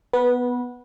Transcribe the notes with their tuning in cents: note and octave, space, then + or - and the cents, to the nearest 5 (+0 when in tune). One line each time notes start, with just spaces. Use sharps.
B3 +0 B4 -20